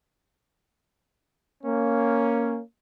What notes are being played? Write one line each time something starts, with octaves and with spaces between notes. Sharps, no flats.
A#3 C#4